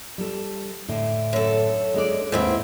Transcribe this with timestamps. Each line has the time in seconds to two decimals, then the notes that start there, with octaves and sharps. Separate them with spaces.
0.18 G3 A4
0.88 A2 D3
1.33 F#2 A4
1.94 G#3 D4 D5
2.32 D#2 G#2 C4 E4 B4